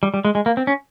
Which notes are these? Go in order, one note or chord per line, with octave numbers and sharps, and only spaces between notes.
G3
G3
G#3
G#3
A#3
C4
C#4